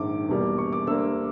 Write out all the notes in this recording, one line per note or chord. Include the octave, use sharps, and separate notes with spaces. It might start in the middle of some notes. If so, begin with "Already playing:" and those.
Already playing: A#1 G#2 D#3 D6
E1 E2 B2 G3 A#3
C#6
D6
D2 D3 G3 A#3 E6